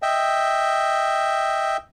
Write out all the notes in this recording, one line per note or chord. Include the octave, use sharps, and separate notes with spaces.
D#5 E5 G5